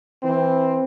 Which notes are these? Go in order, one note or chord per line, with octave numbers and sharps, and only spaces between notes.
E3 C4